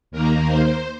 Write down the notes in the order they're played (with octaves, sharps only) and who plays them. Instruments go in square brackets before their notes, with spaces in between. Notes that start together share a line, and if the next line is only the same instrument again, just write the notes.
[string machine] D#2 D#3 A#3 A#4
C5